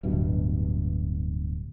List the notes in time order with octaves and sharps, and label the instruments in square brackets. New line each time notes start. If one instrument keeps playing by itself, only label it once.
[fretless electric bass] D1 G2 B2